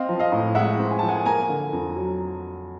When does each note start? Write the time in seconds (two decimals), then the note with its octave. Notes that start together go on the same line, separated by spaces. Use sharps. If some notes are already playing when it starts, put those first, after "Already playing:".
Already playing: C4 D#5 F5
0.09 F3
0.19 D#5 F5
0.32 A2
0.55 G#3 E5 F#5
0.79 C4
0.91 G#5
0.99 F3 A5
1.09 F#5 G#5
1.25 A#3 G#5 A#5
1.49 D3
1.73 F2
1.96 F#3